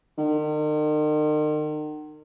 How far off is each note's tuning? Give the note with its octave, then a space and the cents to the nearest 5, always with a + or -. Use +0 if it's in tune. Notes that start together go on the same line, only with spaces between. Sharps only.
D#3 -40